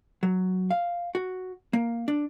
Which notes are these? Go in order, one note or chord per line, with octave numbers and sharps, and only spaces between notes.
F#3
F5
F#4
A#3
D4